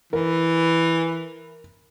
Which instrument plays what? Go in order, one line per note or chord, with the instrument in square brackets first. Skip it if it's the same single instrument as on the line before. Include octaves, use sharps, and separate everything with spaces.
[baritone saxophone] E3 [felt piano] A#4